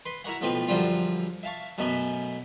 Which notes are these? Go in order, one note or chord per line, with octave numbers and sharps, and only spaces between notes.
B4 C6
E4 F#4 A#4 C#5 F#5
B1 A2 F3 C4 B4
F#2 D3 F3 G3 F4
E5 F5 A5 C#6
F#2 B2 A3 B3 C#4